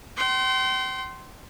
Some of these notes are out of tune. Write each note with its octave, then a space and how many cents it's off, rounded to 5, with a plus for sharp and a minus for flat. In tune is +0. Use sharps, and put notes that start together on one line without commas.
G5 -40 C6 +0